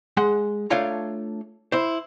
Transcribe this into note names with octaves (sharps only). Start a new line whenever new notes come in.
G#3 F#5 C6
A3 D4 F4 C#5 F5 A#5
E4 C5